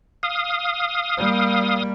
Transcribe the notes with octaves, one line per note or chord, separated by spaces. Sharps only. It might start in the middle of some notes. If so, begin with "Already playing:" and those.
F5 D#6
G3 A#3